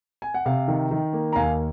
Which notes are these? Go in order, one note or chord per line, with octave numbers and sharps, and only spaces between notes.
G#5
F#5
C3 F5
D#3
D#3
A#3
A#5
D#2 F5 G#5